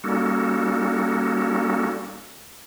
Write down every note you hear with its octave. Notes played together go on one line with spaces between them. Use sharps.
G3 A#3 C#4 D#4 F#4 A4